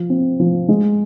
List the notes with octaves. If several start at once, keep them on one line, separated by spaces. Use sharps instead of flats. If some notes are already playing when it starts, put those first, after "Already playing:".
Already playing: F3
C4
F3
G#3